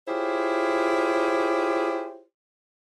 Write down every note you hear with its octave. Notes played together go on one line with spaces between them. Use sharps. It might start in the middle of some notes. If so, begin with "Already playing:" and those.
E4 F4 G4 G#4 C5 C#5